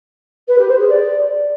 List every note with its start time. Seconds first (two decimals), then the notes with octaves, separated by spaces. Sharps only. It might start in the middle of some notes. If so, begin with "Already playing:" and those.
0.48 B4
0.58 G4
0.68 C5
0.79 G#4
0.89 D5